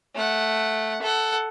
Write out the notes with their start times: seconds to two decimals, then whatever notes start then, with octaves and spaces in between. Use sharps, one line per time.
0.15 A3 F#5
1.02 A4 F#5